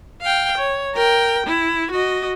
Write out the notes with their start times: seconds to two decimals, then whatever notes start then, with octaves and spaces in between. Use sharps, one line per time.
0.21 F5 G5
0.58 C#5
0.95 A#4 G5
1.46 E4
1.91 F#4 D#5